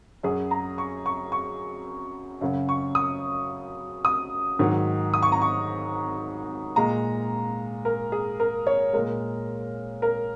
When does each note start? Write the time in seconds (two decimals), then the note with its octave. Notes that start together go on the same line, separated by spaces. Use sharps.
0.23 F#2 F#3 G#4
0.51 A#5
0.78 C#6
1.06 C#6
1.32 C#6
2.41 F#2 C#3 F#3
2.69 C#6
2.95 D#6
4.05 D#6
4.59 G#2 D#3 F#3
5.14 D#6
5.23 C#6
5.32 A#5
5.42 C#6
6.76 A#2 G#3 A#5
7.85 A#4
8.12 G#4
8.40 A#4
8.67 C#5
8.93 A#2 G#3 A#4
10.02 A#4